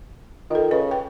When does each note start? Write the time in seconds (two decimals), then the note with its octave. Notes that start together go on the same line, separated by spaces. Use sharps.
0.51 D#3 F4 A4
0.71 C#3 B4
0.91 G5